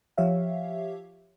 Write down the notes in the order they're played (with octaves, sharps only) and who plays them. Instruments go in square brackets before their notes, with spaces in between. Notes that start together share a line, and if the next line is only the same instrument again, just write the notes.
[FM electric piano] F3 G4 C#5 E5 F5